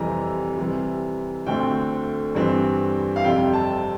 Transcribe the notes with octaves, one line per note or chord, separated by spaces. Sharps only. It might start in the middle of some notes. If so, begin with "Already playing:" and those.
Already playing: F2 C3 E3 G3 A#5
C3 E3 G3
D2 D3 A3 C4 G5
G2 E3 G3 C4
F5
F2 C3 G3 G5
A5